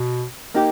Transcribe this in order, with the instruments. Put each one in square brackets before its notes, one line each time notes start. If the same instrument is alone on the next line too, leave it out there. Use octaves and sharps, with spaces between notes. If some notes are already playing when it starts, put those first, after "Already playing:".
Already playing: [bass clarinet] B2
[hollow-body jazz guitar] A#3 D#4 G4